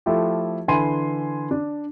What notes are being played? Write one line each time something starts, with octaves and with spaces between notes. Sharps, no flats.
F3 A3 E4 F4 G4
D3 E3 G#5 B5 C6 D#7
D4